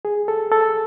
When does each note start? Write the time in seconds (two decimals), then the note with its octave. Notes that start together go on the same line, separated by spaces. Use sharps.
0.05 G#4
0.28 A4
0.51 A4